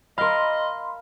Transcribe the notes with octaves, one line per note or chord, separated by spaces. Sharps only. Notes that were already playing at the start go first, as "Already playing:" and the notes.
A#4 D#5 F5 B5 C6